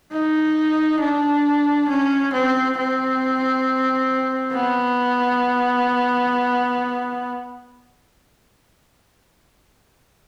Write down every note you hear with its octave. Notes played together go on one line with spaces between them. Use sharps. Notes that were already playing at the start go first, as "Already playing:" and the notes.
D#4
D4
C#4
C4
C4
B3